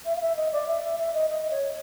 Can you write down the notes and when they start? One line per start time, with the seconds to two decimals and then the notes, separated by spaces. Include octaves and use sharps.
0.05 E5
0.16 F5
0.22 E5
0.37 D#5
0.52 D5
0.68 E5
0.84 E5
0.99 E5
1.14 D#5
1.29 D#5
1.51 C#5